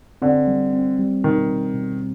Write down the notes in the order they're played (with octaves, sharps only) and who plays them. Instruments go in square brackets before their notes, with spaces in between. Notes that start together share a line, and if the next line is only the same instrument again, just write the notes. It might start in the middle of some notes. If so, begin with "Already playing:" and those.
[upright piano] D3 [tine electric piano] C4
[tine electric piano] G3
C4
G3
[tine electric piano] B2 [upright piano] D#3
[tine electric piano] B2
B2